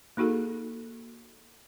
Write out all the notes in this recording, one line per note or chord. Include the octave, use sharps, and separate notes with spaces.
A#3 D#4 F#4 G#4 A4